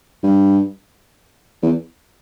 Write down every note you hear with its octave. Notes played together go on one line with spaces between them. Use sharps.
G2
E2